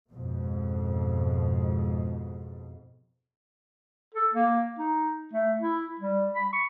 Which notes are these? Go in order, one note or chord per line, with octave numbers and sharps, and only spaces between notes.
F2 G#2 B2
A4
A#3
D#4
A3
E4
G3
B5
C#6